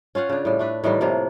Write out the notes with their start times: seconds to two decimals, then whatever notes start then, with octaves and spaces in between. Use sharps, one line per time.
0.15 C#4 F4 F5 F#5
0.29 C#3 D4
0.45 A2 G3
0.59 A3 D4 B4
0.84 A2 D#3 E3 G3
1.01 A2 C3 F3 A#3